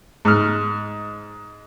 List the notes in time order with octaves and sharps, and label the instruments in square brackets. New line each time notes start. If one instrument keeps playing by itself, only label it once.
[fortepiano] G#2 F6